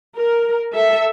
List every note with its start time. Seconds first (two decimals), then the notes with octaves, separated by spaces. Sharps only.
0.16 A#4
0.73 A4 E5